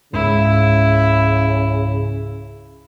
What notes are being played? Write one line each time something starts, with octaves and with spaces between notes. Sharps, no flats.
C#2 G#2 C#3 E4